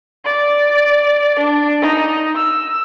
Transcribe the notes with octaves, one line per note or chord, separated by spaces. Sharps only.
D5
D4
D#4
E6